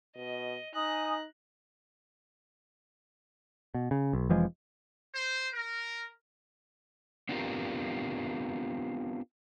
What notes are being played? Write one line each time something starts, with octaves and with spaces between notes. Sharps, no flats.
B2 D#5
D#4 G#5 D#6 F#6 A#6
B2
C#3
B1
F1 E3 F3 G#3
C5
A#4
B3 C4 D4 F4 G4 A#4